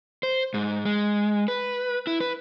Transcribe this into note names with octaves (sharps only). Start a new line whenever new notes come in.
C5
G#2
G#3
B4
E4
B4